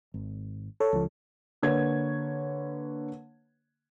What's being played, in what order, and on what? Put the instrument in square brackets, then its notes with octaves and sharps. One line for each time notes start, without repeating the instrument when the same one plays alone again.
[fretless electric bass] G#1
[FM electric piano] A4 C#5
[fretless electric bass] C#2 F3
[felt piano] D3 A#3 B4 C#5 G#6